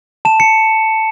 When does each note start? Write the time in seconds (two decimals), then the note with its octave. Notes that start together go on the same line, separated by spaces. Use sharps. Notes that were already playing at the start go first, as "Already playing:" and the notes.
0.25 A5 E7
0.40 C#7